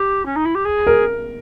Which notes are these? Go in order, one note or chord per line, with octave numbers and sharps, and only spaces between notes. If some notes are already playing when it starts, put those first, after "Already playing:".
Already playing: G4
C#4
D#4
E4
G4
G#4
A#4